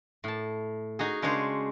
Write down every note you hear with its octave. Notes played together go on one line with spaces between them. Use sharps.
A2 A5
D#4 F#4 G#4
C#3 G#3 D4 C5 C#5